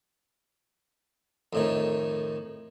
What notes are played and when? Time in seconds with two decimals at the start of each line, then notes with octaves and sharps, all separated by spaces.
1.53 F2 A2 D#3